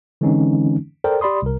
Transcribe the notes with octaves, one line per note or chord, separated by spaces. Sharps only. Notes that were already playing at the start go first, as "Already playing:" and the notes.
D3 E3 G#3 C4 C#4 D#4
A4 A#4 C5 D5 G5
G4 D5 B5 C6 D#6
C2 A#4